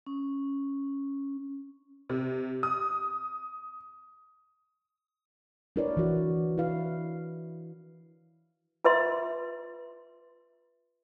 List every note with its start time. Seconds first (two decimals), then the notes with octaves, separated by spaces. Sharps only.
0.06 C#4
2.09 C3
2.63 D#6
5.76 D4 E4 A#4 B4 C#5 D5
5.97 E3 F#4
6.58 E4 B4 F5
8.84 F4 B4 E5 C6